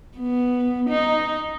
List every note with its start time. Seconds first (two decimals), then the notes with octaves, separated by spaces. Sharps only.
0.18 B3
0.90 D#4